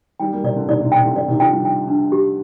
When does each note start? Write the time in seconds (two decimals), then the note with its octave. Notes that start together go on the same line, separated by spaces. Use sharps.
0.20 D#3 G3 G5
0.33 G3 A#3
0.44 C3 D5
0.56 D3
0.68 C3 D#3 D5
0.81 C3 D#3
0.92 C3 G5
1.04 D3
1.16 D3 D5
1.28 C3 D#3
1.40 D3 F3 G5
1.52 D#3 G3
1.65 G5
1.88 D4
2.12 G4